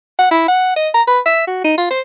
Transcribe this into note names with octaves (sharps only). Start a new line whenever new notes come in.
F#5
E4
F#5
D#5
A#5
B4
E5
F#4
D#4
F4
C5